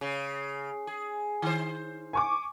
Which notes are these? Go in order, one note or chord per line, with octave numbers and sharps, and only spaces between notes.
C#3
G#4
D#3 C5
G#5 C#6 D6